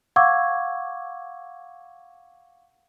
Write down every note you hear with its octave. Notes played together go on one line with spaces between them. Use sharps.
F5 F#5 C#6 D6 E6 G#6